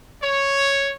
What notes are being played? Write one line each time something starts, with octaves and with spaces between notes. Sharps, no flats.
C#5